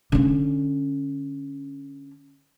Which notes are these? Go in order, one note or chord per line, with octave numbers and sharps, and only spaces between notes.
D3 C#4